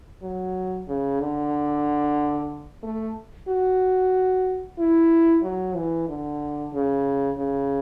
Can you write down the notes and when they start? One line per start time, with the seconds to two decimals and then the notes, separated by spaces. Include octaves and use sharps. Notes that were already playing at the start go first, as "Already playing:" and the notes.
0.22 F#3
0.88 C#3
1.20 D3
2.83 A3
3.48 F#4
4.79 E4
5.43 F#3
5.76 E3
6.09 D3
6.73 C#3
7.38 C#3